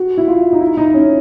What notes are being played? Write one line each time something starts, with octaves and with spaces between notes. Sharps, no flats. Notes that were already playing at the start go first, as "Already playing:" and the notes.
Already playing: F#4
E4
F4
D#4
E4
D#4
C#4